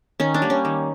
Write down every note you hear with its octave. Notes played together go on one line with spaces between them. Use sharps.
D#3 C#4
D4
G3 A#3
C#4
D#3